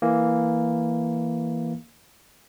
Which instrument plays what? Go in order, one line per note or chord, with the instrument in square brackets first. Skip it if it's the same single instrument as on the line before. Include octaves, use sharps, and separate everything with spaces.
[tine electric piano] E3 A#3